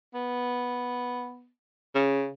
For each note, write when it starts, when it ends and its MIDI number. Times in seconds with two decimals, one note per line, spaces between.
0.14 1.49 59
1.95 2.30 49